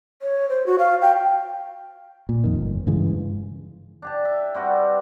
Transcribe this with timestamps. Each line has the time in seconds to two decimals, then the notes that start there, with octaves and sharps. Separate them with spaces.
0.22 C#5
0.49 C5
0.66 F#4
0.79 F5
1.02 G5
2.29 A#2
2.44 F2 D#3
2.55 G1
2.87 G2 C#3 E3 G#3
4.02 D4 G4 A5
4.25 E5
4.55 G3 C4 F#4 B4